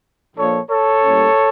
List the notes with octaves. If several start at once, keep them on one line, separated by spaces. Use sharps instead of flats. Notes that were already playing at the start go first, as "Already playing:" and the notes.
A#2 F3 A#3 D4 A4 C#5
A4 C#5
A2 G3 A#3 C#4